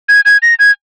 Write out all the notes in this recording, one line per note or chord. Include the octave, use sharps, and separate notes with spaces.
G#6
G#6
A#6
G#6